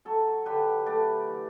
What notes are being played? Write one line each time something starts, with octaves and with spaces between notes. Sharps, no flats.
F#3 A4 C#5
D3 G4 B4
A3 B4 D5
E3